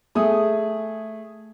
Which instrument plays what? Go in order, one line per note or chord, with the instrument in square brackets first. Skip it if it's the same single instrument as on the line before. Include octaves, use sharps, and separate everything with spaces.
[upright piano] A3 G#4 D#6